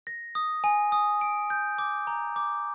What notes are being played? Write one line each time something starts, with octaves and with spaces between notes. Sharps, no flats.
A#6
D#6
G#5
D#6
D7
G6
D6
A#5
D6